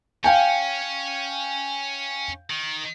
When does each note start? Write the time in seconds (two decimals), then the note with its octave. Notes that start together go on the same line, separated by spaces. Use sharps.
0.24 C#4 F5 G5 G#5
2.50 D#3